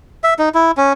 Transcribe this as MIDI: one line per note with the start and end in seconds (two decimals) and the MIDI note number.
0.24 0.34 76
0.39 0.49 63
0.54 0.71 64
0.77 0.93 61